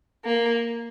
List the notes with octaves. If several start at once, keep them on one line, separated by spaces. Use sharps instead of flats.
A#3